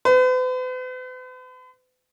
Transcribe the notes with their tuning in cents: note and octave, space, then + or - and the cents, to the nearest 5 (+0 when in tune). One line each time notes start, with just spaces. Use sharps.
B4 +45